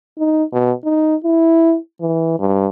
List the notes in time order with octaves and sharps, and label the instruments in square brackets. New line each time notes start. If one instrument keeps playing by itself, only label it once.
[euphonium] D#4
B2
D#4
E4
E3
G2